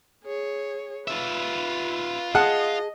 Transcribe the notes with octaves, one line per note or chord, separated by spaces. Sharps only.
G#4 C#5
F4 B4 E5
G#4 D#5 F#5 A5